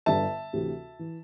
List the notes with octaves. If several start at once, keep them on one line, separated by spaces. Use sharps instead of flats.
G1 G2 D3 E5 A5
D2 C3 E3
E3